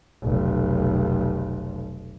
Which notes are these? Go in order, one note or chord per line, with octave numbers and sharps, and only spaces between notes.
F1 B1